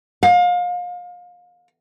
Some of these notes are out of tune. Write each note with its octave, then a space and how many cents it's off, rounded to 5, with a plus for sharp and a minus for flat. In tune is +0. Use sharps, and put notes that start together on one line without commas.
F5 +30